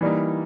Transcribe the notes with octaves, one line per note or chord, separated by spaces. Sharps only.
E3 G3 A#3 D#4